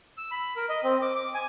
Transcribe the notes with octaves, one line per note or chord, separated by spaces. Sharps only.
E6
B5
A#4
D#5
C4
D6
D6
G#5